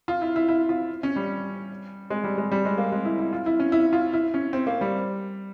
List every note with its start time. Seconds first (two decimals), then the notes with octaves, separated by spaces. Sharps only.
0.08 F4
0.22 E4
0.36 E4
0.48 E4
0.69 F4
1.03 C#4
1.16 G3
2.10 G#3
2.24 G3
2.38 G#3
2.52 G3
2.65 G#3
2.78 A#3
2.92 G#3
3.05 E4
3.19 E4
3.33 F4
3.46 E4
3.60 C#4
3.72 E4
3.93 F4
4.13 E4
4.34 C#4
4.53 C4
4.67 A#3
4.81 G3